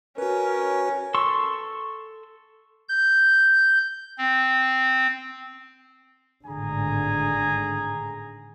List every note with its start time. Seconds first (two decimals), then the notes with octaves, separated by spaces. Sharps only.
0.18 C#4 F#4 A#4 B4
1.15 A4 C6 C#6 E6
2.89 G6
4.18 C4
6.45 G#1 A2 D3 G#4 G#5 A#5